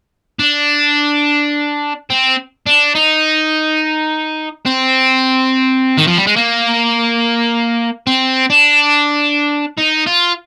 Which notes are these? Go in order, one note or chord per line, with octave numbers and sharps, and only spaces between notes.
D4
C4
D4
D#4
C4
D#3
F3
G3
G#3
A#3
C4
D4
D#4
F4